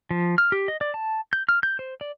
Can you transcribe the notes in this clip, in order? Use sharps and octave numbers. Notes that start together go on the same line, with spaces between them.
F3
F6
G4
D#5
D5
A5
G6
F6
G6
C5
D5